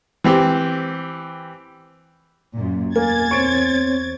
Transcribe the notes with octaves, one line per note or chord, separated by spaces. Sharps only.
E3 C4 G4
F#2 A#2
E2 A#3 G#5 G#6 A6
C4 C5 C#5 C#6 D7